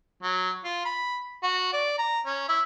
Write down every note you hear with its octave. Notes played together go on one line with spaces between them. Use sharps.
F#3
F4
B5
F#4
D5
A#5
C#4
E4